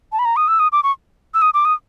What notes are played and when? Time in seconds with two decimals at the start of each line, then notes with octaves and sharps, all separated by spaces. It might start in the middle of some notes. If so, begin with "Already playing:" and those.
0.12 A5
0.19 B5
0.25 A#5
0.36 D#6
0.48 E6
0.59 D#6
0.72 D6
0.83 C#6
1.34 E6
1.42 D#6
1.54 D6
1.65 D#6